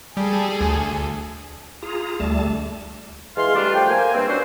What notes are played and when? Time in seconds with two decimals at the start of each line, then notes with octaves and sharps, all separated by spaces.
0.17 G3 G#4 A4
0.61 D2
1.83 F4 G#4 A#5
2.20 D2 G3 A3 A5
3.36 E3 G#3 F5 C6
3.55 G3 A3 D4 F4
3.74 F3 A3 G5
3.89 A#3 C5 G#5
4.14 G2 C4
4.27 C#4 D4 F#4 C5